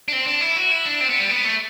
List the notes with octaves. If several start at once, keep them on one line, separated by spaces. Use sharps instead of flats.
D4
C4
D4
E4
F#4
E4
D4
C4
B3
G3
B3
A3